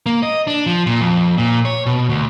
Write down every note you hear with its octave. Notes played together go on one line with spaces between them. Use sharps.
A#3
D#5
D4
F3
A#2
F2
A#2
C#5
B2
D2